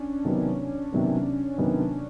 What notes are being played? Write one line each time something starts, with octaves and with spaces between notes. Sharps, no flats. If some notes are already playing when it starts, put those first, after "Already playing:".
Already playing: C#4 D4
C3 D#3 F#3 B3
C3 D#3 F#3 B3
C3 D#3 F#3 B3